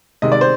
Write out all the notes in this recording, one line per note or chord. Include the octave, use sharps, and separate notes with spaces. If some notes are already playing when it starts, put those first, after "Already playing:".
C3 D#3 G#3 D#5
D5
C5